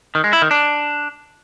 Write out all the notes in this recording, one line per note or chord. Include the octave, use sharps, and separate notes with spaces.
D#3
G#3
E4
D#3
D4